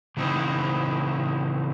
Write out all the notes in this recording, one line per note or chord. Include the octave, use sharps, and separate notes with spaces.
C#3 E3 C4 D#4